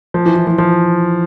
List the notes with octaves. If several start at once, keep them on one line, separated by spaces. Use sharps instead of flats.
F3
E3
E3
F3
F3